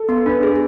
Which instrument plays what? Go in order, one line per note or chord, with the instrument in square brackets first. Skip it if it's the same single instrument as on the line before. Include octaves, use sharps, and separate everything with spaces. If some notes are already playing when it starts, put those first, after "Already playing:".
Already playing: [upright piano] A4
[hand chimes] B3
[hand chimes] D4 [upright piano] B4
[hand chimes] G#4